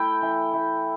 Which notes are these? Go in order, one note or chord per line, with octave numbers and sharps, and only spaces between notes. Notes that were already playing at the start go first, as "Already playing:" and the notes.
Already playing: A3 E4 G5
E3
A3 E4